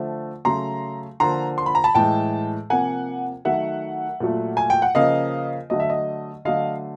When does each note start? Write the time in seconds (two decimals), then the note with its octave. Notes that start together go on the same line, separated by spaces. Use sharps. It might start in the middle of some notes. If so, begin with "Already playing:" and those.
Already playing: D3 F3 A3
0.45 C#3 F#3 A3 A#5 C6
1.20 D3 F3 A#3 A#5 C6
1.58 C6
1.66 B5
1.75 A#5
1.84 A5 B5
1.95 A2 E3 G#3 G5 A5
2.70 C3 F3 A#3 F#5 G#5
3.45 D#3 F#3 A3 E5 F#5
4.20 A#2 F#3 A3
4.57 G#5
4.70 G5
4.82 F#5
4.95 C#3 F3 A#3 D#5 F5
5.70 D3 F#3 A3 D#5
5.80 E5
5.90 D#5
6.45 D3 F#3 A3 D#5 F5